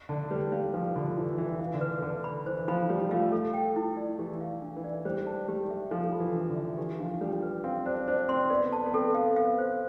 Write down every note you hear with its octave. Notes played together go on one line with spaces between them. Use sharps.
D3 A5
G3 B4
G3 F5
F3 B4
D3 B5
E3 F4
E3 E5
E3 F5
D3
B4
D3 B4
B5
E3 C5
F3 B5
G3 F4
A3 F5
A4
G5
E4
D5
E3 G4
F5
D4
E3
D5
G3 C5
A5
G3 G4
E5
F3 A4
B5
E3
D4
D3
E5
E3 G4
F3 D4
G3 D4
B4
C4 F5
D4 C5
D4 C5
C4 C6
B3 D5
A5
B3
C4 A4
F5
B3 F5
C5